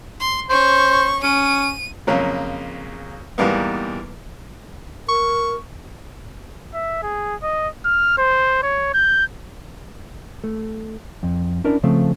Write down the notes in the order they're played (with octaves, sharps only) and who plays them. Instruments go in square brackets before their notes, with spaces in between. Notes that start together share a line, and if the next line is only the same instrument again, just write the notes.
[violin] C6
[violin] C#4 C#6 [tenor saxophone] C5
[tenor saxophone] C#4 [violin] D#7
[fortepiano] F2 C#3 F#3 A#3
E2 G#2 G3 A#3 B3
[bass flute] A#4 [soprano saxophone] C#6
[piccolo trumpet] E5
G#4
D#5
F6
C5
C#5
G6
[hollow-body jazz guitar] A3
F2
C#4 D4 E4 A#4 D5
C#3 F3 A3 C4